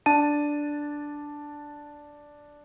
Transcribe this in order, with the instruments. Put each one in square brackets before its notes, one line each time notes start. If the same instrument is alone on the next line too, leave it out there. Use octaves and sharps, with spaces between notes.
[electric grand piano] D4 A5 D#7